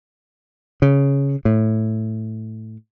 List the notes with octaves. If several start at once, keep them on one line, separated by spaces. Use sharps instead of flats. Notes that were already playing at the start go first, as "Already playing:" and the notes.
C#3
A2